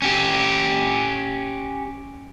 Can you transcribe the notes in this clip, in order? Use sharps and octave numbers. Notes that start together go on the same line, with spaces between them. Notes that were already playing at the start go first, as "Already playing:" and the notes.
C#4 G4